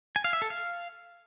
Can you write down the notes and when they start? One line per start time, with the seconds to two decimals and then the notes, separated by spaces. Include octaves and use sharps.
0.16 G#5
0.24 F5
0.33 E5
0.42 A4
0.50 F5